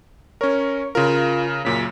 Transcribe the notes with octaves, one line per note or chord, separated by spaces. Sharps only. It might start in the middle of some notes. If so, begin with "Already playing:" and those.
C#4 A#4 C#5
C#3 F4 A#4
F#2 A#2 C#3 B6